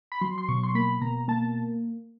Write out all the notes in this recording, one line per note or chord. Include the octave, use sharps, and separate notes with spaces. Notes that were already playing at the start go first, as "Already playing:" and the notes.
B5
F#3 C6
C6
B2 C#6
C6
A#3 B5
B2 A#5
A#3 A5